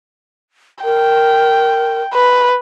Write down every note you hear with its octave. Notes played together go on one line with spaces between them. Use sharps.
A#4 G5
B4